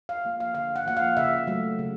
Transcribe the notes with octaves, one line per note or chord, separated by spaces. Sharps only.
F5
F3 A#3
F5
D3 F5
F#5
F3 A#3 F#5
F5
C#3 E5
F#3 A3
C#3